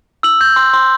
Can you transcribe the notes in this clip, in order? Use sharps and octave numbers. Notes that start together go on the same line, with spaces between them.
E6 F#7
G6
C6
C6